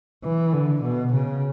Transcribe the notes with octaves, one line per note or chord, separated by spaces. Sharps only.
E3
D3
B2
C#3